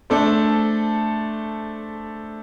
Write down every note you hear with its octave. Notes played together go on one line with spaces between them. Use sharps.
A3 D4 A4 C5